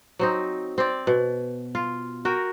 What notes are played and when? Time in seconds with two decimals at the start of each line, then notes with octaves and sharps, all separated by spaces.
0.19 F#3 C4 D#4
0.78 C4 D5
1.07 B2
1.75 F4
2.25 F#4 A#4 G5